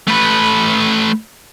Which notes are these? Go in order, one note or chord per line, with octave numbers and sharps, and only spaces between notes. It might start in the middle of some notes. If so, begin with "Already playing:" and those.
A3 B4